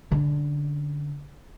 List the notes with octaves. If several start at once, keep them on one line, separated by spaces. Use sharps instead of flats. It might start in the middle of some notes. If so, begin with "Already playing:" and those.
D3 C#4